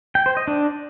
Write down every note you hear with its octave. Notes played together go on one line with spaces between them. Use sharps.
G5
C5
D#5
D4